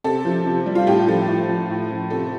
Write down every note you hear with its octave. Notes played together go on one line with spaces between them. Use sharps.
C3 A4
F3
C3
G3
F4
A2 G4
F3 A4
A2
F3
A2
F3
C3 A4